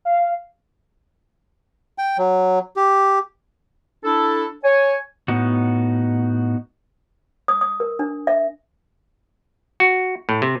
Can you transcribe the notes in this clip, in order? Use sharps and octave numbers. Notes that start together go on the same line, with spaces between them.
F5
G5
F#3
G4
D4 E4 A4
C#5 G#5
A2 B3 D#4 F#4
D#6
D#6
A#4
D4
E5
F#4
A2
C3